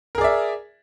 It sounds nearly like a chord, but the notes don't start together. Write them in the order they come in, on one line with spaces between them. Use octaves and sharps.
A#4 G#4 D5 E5